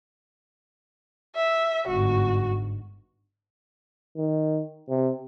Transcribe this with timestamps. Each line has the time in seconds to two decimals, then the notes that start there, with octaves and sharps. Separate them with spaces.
1.36 E5
1.88 G1 G#2 F#4
4.17 D#3
4.89 C3